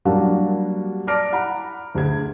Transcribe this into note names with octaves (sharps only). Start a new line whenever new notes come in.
F#3 G3 A#3 D4 F#4
D5 A5 D6 F6 A#6 D7
F#5 A#5 B5
D2 G#4 G#6